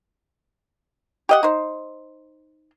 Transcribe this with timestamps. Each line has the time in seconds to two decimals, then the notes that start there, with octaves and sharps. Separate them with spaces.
1.29 G4 D#5 F#5
1.43 D#4 C5